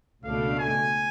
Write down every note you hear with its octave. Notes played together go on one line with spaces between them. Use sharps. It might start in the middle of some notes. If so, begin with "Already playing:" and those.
C#2 B2 A3 D4 F5
G#5